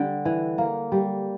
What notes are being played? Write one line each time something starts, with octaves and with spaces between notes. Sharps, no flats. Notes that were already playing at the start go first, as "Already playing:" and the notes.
Already playing: D3 G3 G5
E3
A#3
G3